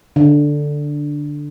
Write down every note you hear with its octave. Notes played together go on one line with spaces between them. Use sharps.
D3